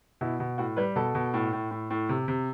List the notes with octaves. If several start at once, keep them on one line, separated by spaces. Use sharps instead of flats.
B2 E4
B2
A2 F#4
G3 B4
B2 A4
B2
A2
A2
A2
A2
C3
C3